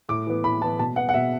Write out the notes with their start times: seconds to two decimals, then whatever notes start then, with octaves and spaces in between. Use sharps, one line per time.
0.09 A2 D6
0.27 E3 B3
0.44 A2 B5
0.62 E3 A5
0.64 B3
0.79 B2 A5
0.96 B3 F#5
1.09 F#5
1.14 B2 E5